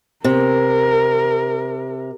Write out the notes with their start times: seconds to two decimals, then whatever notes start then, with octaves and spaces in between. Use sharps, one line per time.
0.24 C3 A#4